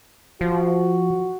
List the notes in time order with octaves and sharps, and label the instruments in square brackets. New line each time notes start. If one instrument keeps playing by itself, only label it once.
[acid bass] F3 [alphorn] F#4